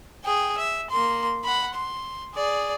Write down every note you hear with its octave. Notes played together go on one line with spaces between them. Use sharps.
G#4 G5
E5
A#3 C6
F#5 B5
C6
G#4 D5